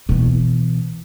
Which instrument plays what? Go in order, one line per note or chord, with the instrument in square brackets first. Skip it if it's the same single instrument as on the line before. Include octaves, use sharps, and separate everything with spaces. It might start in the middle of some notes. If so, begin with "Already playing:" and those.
[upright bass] B2 E3